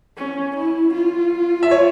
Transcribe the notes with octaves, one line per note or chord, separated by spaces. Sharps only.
C#4
E4
F4
E5
C#5